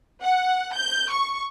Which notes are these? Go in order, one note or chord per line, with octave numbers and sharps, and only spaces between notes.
F#5
G6
C#6